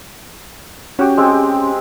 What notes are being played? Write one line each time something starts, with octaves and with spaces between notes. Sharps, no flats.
C#4 F#4 G4
G#3 C4 G4